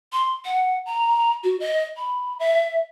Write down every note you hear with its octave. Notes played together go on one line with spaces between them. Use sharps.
C6
F#5
A#5
F#4
D#5
B5
E5